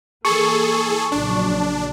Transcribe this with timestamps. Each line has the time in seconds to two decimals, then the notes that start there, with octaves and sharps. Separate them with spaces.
0.25 E3 A#3 G#4 A4 C#6
1.12 A#1 C#3 F#3 D4